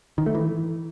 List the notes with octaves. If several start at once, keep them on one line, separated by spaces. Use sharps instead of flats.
D#3
A3
E3